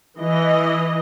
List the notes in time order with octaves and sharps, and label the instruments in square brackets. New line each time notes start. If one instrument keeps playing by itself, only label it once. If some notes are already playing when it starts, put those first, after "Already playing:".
[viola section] E3 D#5